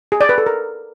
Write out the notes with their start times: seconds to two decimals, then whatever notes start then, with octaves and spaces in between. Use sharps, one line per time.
0.12 G#4
0.21 D5
0.29 B4
0.38 A4
0.46 A#4